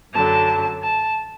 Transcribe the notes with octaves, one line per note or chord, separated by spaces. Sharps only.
F#2 D3 F#3 A5
A5